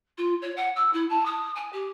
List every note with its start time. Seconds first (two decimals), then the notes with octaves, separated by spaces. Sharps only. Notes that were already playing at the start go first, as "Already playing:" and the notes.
0.17 F4
0.41 C#5
0.56 F#5
0.75 E6
0.93 E4
1.09 A5
1.25 D#6
1.55 G#5
1.72 G4